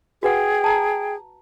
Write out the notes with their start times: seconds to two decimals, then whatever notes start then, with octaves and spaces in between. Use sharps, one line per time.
0.23 F#4 G#4 B4 F#5 G5
0.64 A5 A#5